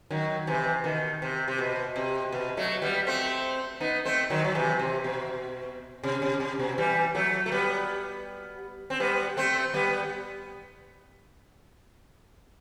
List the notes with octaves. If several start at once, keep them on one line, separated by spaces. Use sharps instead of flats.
D#3 F#3
C3 E3
B2 D#3
C3
C3
B2
C3
B2
F#3 A3
G3 B3
A3 C4
B3 D#4
A3 C4
D#3 F#3
F#3
C3 E3
C3
B2
C3
C3
C3
B2
E3 G3
F#3 A3
A3
G3 B3
C4
G3 B3
A3 C4
G3 B3